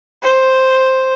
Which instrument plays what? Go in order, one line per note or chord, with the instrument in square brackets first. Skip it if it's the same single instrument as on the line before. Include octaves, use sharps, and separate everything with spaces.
[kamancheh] C5